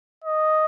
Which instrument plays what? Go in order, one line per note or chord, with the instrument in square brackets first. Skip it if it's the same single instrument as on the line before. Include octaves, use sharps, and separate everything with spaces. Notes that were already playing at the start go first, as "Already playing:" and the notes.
[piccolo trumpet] D#5